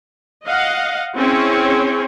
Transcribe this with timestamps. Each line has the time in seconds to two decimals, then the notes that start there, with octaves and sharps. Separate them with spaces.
0.46 D#5 F5 F#5
1.15 C4 C#4 E4 G#4 C#5